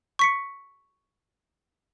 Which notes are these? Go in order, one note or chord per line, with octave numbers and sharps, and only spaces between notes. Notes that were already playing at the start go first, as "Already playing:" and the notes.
C#6 B6 C#7